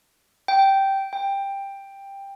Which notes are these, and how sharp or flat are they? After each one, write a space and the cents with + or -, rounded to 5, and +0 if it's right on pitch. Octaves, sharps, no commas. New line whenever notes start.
G5 -10
G5 +10